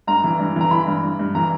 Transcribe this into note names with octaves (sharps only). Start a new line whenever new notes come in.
G2 A#5
E3
G2
E3 A#5
E3 B5
G2
G2
G2
E3 A#5